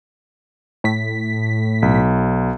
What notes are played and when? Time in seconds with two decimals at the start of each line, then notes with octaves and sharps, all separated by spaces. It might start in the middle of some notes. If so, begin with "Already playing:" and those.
0.84 A2 B6
1.82 B1